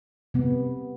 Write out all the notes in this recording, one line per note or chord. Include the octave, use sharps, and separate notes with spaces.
C3 B3